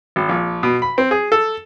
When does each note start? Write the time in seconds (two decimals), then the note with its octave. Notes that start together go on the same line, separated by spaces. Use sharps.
0.16 G#1
0.29 A#1
0.63 B2
0.82 B5
0.98 C4
1.11 G#4
1.32 A4